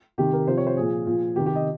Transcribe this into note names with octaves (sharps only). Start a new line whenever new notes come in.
C3 D#3 G4
A#4
C3 F3 C5
C#5
C5
A#2 F3 G#4
A#2 F3
C3 D#3 G4
G4
D#5